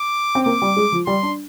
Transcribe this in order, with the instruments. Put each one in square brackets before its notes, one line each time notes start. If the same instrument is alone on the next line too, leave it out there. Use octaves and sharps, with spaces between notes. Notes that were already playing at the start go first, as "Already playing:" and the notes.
Already playing: [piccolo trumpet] D6
[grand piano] C4
[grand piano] A#3 [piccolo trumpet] D6
[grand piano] G3
G#3
F3
[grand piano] G3 [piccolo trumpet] C6
[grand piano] D4